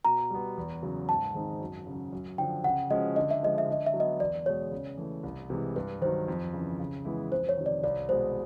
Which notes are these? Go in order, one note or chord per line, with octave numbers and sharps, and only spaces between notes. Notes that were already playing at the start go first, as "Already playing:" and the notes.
B2 A#5
G3 B3
E2
C#3 F#3
G#2 A5
D#3 G#3 C4 D#4
F#2
C#3 F#3
F#2
D3 F3 G5
C#3 F#5
F3 G#3 C#4 F#4 D#5
D3 D#5
E5
F3 G#3 D#5
E5
D3 D#5
E5
F#3
B3 D#5
E2 D5
B2 G#3 C#5
C#3
E3 A3
C2
C3 E3 G#3
G2 B4
D#3 F#3 C5
F2
C#3 E3
C#3
E3 G#3 B3 E4
F2 C5
C#5
C3 D#3
D5
C2 D5
B2 G#3 C5